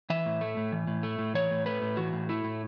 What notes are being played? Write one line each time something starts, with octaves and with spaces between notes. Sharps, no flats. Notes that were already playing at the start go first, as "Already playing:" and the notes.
E3 E5
A2
A3
A2
E3
A2
A3
A2
E3 C#5
A2
A3 B4
A2
E3 F#4
A2
A3 E4
A2